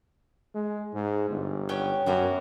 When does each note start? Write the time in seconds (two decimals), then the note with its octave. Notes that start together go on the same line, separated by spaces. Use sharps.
0.55 G#3
0.94 G#2
1.30 G1
1.69 B3 C#4 G5
2.06 F#2 A#3 B3 F#4